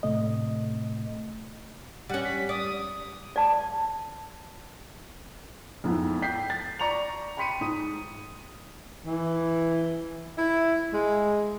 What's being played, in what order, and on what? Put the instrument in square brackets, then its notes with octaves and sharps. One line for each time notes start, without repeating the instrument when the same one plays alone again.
[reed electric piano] A2 C3 A3 D#5
[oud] G3 C#4 [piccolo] F#5
[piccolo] B6
[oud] D5 [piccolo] D#6
[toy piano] D5 A5
[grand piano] F2 G#2 B3 E4
G5 G6 B6 C7
A6
D5 A#5 C#6 C#7 F7
G5 B5 C6 B6 C#7 D#7
G#2 D#6 D#7
[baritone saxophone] E3
E4
G#3